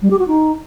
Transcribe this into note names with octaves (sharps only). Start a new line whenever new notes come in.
G3
G4
F#4
D#4